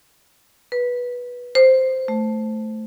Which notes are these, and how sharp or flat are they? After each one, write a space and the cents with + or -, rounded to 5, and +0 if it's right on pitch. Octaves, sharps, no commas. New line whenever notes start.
B4 -15
C5 -5
A3 -5